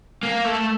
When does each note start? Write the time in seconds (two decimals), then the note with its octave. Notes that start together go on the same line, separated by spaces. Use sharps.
0.23 A#3
0.45 A3